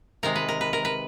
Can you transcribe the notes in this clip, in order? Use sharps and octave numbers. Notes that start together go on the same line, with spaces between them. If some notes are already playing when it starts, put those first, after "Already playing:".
C3 D#3 G#3 A#4
B4
A#4
B4
A#4
B4